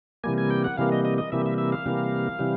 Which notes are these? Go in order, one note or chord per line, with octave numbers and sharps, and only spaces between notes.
C3 E3 G3 A#3 G#5
G#5
G5
F#5
C3 E3 G3 A#3 F5
D#5
D#5
D#5
C3 E3 G3 A#3 E5
E5
E5
F5
C3 E3 G3 A#3
C3 E3 G3